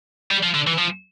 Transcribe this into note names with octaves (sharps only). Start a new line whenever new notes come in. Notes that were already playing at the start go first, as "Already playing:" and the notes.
G3
F3
D3
E3
F3